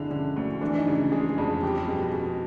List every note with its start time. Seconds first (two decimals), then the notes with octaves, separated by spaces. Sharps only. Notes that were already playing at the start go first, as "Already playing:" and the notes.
Already playing: D3 G#3 D4 E4
0.10 D3 C#4
0.37 D2
0.61 E3 D4
0.78 D#4
0.87 C#3
1.12 G#3 G#4
1.38 F2 G#4
1.63 G3 G4
1.88 B2 G#4
2.13 B2 G#4